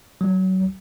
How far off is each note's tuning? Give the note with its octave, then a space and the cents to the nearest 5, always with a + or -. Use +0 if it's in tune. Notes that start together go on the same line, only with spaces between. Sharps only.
F#3 +25